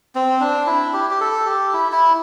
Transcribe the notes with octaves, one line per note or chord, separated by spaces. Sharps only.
C4
D4
E4
G4
G4
A4
G4
E4
E4